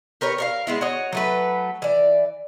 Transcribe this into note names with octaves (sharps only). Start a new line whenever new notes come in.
G4 A#4 B4 C#5
A#4 C#5 F5
G#3 B3 E4
F#4 C#5 D#5
F#3 A3 B4
E3 D5